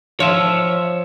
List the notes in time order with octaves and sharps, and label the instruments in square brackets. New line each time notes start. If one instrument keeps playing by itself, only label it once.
[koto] F3 [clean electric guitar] C#5 E5